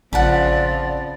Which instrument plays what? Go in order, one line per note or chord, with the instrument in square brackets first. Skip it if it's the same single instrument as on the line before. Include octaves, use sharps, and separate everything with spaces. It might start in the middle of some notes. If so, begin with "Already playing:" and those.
[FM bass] A1 [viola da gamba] C#3 F3 C4 [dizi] D5 [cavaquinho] F#5 A5 B5